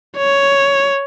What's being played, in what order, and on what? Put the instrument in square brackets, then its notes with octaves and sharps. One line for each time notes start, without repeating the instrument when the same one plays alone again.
[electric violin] C#5